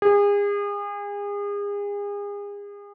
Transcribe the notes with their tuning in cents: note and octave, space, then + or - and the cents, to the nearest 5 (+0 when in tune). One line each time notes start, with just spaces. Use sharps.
G#4 -35